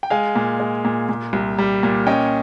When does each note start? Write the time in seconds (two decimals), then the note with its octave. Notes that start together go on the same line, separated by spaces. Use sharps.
0.03 G5
0.10 G#3 F5 G#5
0.36 A#2
0.60 G#3
0.85 A#2
1.09 A#2
1.33 C2
1.58 G3
1.83 A#2
2.07 C#4 D#5 G5